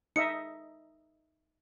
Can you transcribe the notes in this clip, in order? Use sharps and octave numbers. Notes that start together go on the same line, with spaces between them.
D#4 D#5 E5 C#7